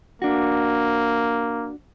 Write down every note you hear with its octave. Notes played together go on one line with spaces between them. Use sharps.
A#3 D4 F#4